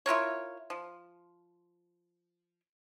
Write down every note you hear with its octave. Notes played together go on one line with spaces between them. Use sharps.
E4 F4 A#4 C#5
F3